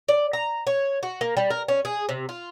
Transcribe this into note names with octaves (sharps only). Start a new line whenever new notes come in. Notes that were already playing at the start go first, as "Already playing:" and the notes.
D5
A#5
C#5
F#4
A#3
G3
A#4
C#4
G#4
C3
F4